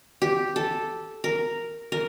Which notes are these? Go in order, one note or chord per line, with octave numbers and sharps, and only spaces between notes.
G4
A4
A#4
A#4